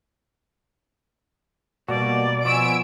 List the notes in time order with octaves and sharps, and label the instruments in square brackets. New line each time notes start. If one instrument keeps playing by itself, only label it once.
[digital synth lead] B2 [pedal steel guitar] G3 A#3 F#4 [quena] D5
[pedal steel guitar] F3 B3 C#6 [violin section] G#5 E6 D7